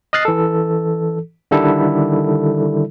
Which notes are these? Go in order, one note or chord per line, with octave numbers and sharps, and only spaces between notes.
D#5 D#6 F6 F#6 A6 C7
E3 A4
D3 D#3 G3 E4 A4